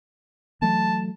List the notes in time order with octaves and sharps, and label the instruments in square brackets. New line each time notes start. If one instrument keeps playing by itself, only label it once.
[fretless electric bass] E3 F#3 A3 [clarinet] A5